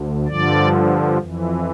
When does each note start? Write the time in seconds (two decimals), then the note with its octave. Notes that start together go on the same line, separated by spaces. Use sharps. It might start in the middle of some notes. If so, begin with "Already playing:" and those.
Already playing: D2
0.28 G2 D3 F3 D5
1.18 F2 E3